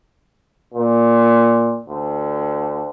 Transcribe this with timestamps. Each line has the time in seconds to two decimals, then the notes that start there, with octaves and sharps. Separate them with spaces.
0.74 A#2
1.89 D2